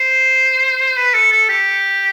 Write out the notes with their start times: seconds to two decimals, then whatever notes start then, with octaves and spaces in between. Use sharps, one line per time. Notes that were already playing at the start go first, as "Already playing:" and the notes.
Already playing: C5
0.97 B4
1.14 A4
1.32 A4
1.49 G4